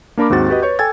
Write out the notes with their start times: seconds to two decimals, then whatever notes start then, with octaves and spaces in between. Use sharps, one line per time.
0.17 A#3 D4 A#4 B5 D6
0.30 D#2 G#2 C4 F#4 A6
0.48 F#4 G4 B4 D#5
0.62 B4 C#5 C#6 G6
0.79 A4 G5 G#5 E6 G#6 A6